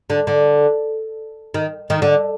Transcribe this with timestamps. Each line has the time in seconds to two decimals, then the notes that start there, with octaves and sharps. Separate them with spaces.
0.10 D3
0.27 D3
1.54 D#3
1.90 D#3
2.02 D3